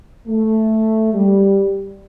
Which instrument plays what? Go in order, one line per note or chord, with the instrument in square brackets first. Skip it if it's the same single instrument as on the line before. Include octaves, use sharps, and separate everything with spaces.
[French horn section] A3
G3